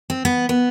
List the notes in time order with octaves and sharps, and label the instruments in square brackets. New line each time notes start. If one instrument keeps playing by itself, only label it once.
[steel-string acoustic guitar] C4
B3
B3